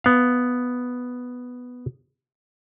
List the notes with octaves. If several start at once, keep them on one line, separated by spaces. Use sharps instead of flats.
B3 F5